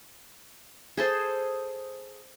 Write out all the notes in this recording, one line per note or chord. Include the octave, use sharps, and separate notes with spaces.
G#4 A4 C5